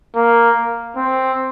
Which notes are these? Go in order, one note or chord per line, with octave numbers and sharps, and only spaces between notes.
A#3
C4